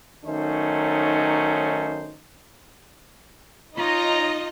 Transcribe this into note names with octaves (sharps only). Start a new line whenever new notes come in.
D#3 F#3 A3 C#4 D#4 C5
D#4 F4 C#5 D#5 A#5